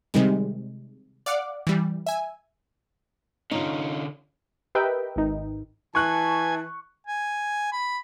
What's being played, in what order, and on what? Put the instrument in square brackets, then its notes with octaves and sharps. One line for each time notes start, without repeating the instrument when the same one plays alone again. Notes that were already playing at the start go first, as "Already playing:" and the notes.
[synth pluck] C3 D#3 G3 G#3
D5 F5 F#5 D6
E3 G3
E5 G#5
[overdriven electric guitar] D3 C#4 [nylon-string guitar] D#4 F4
[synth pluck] G4 A#4 B4 D#5 E5 G5
G#1 D#4
[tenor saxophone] E3 [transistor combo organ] G#5 [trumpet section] A5 [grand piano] C#6 F#6
[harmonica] G#5
B5